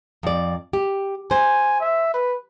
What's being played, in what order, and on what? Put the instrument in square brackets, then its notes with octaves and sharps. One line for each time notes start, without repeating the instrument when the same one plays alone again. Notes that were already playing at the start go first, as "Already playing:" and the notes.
[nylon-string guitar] F2 D5
G4
[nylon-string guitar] C5 [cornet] G#5
[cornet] E5
B4